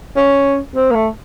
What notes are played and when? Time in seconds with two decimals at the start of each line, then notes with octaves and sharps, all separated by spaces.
0.17 C#4
0.76 C4
0.91 A#3
0.95 A3